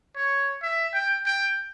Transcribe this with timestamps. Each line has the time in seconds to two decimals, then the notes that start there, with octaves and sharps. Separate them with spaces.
0.16 C#5
0.62 E5
0.94 G5
1.26 G5